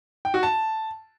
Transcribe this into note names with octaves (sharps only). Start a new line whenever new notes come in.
G5
F#4
A5